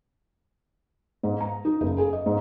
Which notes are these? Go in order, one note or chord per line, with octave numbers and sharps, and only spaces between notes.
G#2
A#5
D#4
F#1
G#4
D#5
G#2